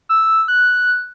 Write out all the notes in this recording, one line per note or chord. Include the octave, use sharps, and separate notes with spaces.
E6
F#6